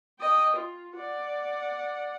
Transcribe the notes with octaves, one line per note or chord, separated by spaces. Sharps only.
D#5 G5
F4
D5 F#5